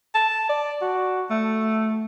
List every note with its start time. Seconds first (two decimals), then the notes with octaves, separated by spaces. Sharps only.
0.15 A5
0.49 D5
0.82 F#4
1.30 A3